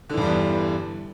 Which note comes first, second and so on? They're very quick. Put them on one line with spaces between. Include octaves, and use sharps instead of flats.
D3 E3 G2 G3 E2